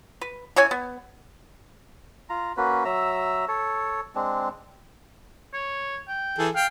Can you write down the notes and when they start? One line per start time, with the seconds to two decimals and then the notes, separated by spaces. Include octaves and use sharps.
0.21 B4
0.56 E3 C#4 C#5 G#5
0.71 B3
2.30 F4 A#5
2.57 A#3 C#4 F#4 B4
2.85 F#3 E5 A#5 E6
3.48 A4 C#5
4.15 G#3 C4 D4
5.53 C#5
6.08 G5
6.38 E3 G#4 A4
6.55 F5 G5